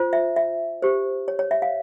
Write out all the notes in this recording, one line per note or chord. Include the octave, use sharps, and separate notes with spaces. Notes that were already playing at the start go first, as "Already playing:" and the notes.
Already playing: F4 C5
E5
E5
G4 C5
C#5
C#5
E5
F5